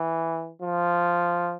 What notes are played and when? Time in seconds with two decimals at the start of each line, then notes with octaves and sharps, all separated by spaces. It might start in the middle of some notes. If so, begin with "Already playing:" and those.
Already playing: E3
0.62 F3